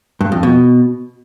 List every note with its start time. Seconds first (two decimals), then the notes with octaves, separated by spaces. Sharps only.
0.21 G2
0.32 F2
0.43 B2